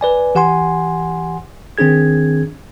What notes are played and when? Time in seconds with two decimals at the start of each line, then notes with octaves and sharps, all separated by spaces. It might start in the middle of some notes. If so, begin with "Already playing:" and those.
0.01 B4 D5 G#5
0.35 E3 G4 F#5 G#5 C6
1.78 D#3 C4 D4 G#4 G#6